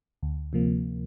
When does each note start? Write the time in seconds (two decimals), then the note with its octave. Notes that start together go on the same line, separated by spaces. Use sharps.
0.23 D2
0.53 C3 F3 A#3